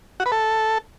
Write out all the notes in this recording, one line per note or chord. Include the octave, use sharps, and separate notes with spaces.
F#4
B4
A4